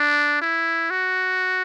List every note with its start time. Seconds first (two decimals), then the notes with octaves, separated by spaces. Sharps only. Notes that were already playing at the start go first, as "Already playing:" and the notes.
Already playing: D4
0.41 E4
0.90 F#4